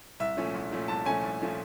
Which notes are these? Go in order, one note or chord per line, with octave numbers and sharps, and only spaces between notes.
C2 E5
A#2 F3 A3 C#4
C2
A#2 F3 A3 C#4
C2 A5
A#2 F3 A3 C#4 G#5
C2
A#2 F3 A3 C#4